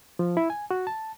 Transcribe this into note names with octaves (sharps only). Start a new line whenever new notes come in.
F3
E4
G#5
F#4
A5